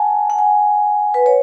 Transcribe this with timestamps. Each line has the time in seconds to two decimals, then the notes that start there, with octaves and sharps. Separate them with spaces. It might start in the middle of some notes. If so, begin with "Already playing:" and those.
Already playing: F#5 G#5 A5
0.30 F#5
0.39 G#5
1.14 B4
1.26 C#5